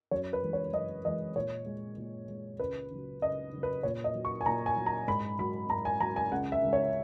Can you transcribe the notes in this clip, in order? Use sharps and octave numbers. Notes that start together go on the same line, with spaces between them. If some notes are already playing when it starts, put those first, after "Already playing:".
F#2 C#5
B4
E3 G#3
C#5
F#2 D#5
E3 G#3 D#5
A#2 C#5
G#3
A#2
G#3
C#2 B4
C#3 F#3
C#2 D#5
C#3 F#3
B4
A#2 C#5
D#5
F#3
C#6
G#5
A#2 A#5
G#5
F#3
A#5
G#2 B5
F#3 B5
G#2 A#5
G#5
F#3 A#5
G#5
C#2 F#5
E5
C#3 G#3
C#5